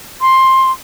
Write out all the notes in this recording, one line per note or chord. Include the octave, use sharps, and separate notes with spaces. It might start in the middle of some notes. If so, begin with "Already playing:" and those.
C6